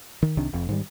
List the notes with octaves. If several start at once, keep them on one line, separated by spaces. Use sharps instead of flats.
D#3
C2 C3 D#3 D4
F1 F2
G#2 D#3 G3